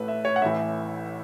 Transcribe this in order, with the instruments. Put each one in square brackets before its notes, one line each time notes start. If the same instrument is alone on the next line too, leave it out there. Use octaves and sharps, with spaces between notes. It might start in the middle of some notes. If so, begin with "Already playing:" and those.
Already playing: [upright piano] A1 A2 A3 A4 B4
E5
C#5
F#5
A1 A2 E3 A3 E5